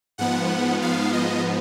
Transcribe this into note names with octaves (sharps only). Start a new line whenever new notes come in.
G#2 F3 B3 F#5
F5
D#5